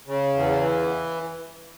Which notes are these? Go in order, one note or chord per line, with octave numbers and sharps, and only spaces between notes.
C#3
E2
E3